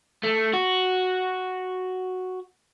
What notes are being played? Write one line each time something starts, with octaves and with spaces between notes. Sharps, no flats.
A3
F#4